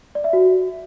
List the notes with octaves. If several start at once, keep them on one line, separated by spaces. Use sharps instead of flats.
D5
E5
F#4